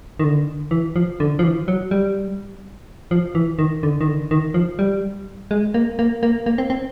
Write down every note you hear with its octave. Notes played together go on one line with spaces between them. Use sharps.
D#3
D3
E3
F3
D3
F3
E3
F#3
G3
F3
E3
D#3
D3
D#3
D3
D#3
F3
G3
G#3
A#3
A#3
A#3
A#3
C4
C4